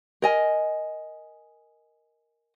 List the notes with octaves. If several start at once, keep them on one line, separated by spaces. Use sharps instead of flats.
A#4 D#5 G#5